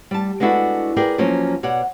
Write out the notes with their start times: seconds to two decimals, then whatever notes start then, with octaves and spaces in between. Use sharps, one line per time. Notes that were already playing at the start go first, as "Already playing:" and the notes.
0.11 G3 A5
0.40 G#3 B3 D4 E4 F#4 A4
0.97 G#4 A#4 B4 D5 G5
1.18 F3 F#3 A#3 C#4
1.63 B2 C#5 D5 F#5